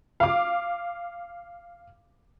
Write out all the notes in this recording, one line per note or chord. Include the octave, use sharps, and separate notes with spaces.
F5 D6